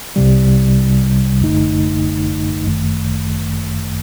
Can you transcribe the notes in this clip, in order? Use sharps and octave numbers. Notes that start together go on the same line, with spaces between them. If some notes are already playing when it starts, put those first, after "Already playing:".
C2 C3 G3
G1 F#2 D3 A3 D#4
G1 F#2 D#3 A3